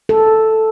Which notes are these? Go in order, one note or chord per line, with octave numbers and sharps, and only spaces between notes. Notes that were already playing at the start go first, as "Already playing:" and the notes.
A4